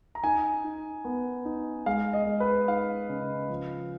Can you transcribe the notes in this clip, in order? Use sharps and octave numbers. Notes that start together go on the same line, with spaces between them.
A#5
D#4 G#5
D#4
B3
D#4
G#3 F5
D#5
G#3
B4
D#4 F5
C#3
F3